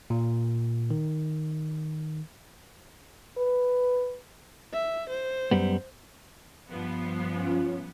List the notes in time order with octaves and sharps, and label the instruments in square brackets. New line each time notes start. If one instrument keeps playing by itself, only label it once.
[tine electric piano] A#2
D#3
[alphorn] B4
[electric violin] E5
C5
[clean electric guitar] F#2 G3 B3
[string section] G2 F3 B3
[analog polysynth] C#4 F4